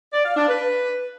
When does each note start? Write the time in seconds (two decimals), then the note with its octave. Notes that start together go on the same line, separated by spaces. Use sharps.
0.13 D5
0.25 F5
0.37 D4
0.49 B4